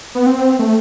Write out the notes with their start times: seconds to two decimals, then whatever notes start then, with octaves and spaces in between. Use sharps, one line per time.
0.15 B3
0.26 C4
0.59 A3